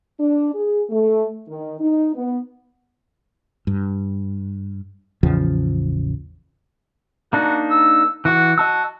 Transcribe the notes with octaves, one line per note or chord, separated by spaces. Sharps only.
D4
G#4
A3
D#3
D#4
B3
G2
A1 E2 C#3 F3
A#3 D4 D#4 F#4
E6
E3 F#4 F#5
F#4 D#5 A5 E6